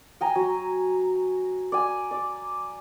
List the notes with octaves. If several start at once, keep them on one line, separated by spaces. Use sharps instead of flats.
G5 G#5 A#5
F#3
D5 G#5
D5